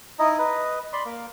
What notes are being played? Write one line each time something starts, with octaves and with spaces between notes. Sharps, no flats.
D#4 E4 D#5
B4 D#5
D5 B5 C6
A#3